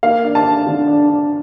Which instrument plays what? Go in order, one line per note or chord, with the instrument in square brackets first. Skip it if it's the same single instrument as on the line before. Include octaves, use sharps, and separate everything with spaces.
[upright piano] A#3 F5
D4
A5
D4
D3
D4
D4